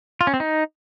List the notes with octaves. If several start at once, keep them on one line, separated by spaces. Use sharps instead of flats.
F4
C#4
C4
D#4